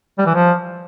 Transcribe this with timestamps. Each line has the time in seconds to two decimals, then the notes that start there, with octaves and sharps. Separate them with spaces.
0.18 G3
0.26 E3
0.34 F3